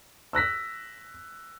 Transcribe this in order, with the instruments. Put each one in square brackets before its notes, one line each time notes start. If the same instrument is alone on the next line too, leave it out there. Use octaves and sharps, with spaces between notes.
[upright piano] E6 F#6 A#6 B6